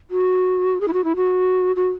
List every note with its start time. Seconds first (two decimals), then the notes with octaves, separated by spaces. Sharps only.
0.11 F#4
0.81 G#4
0.88 E4
0.93 F#4
1.04 E4
1.16 F#4
1.76 F#4